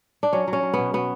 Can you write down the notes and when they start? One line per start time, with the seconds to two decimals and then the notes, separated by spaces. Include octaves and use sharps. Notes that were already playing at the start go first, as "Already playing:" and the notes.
0.23 D4
0.33 F#3 C#4
0.48 F#3
0.53 C#4
0.63 F#3
0.73 B3
0.79 B2
0.93 B2 B3